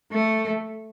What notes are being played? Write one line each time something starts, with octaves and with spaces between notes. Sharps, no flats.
A3